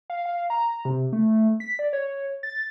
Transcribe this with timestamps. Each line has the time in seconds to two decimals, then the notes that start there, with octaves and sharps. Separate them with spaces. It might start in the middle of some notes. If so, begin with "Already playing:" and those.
0.10 F5
0.26 F5
0.50 A#5
0.85 C3
1.13 A3
1.60 B6
1.79 D5
1.93 C#5
2.43 A6